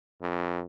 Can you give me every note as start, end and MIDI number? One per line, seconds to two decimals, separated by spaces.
0.22 0.63 41